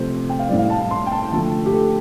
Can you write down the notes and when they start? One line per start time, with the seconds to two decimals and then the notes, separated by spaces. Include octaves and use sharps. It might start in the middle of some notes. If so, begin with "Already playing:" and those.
Already playing: C3 F3 A3 C5
0.29 G5
0.39 F5
0.49 A2 G3 D5
0.59 F5
0.70 A5
0.80 A5
0.91 C6
1.06 G5
1.11 A5
1.32 D3 F3 A3 A5
1.66 G4
1.73 A4